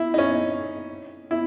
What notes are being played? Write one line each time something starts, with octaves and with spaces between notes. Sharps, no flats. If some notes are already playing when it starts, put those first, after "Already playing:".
Already playing: E4
D#4
C#4
E4